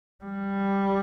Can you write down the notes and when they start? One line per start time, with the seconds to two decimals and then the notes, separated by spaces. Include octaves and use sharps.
0.25 G3